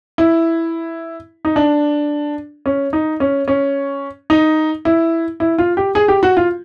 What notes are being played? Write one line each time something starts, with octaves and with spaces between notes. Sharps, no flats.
E4
D#4
D4
C#4
D#4
C#4
C#4
D#4
E4
E4
F4
G4
G#4
G4
F#4
F4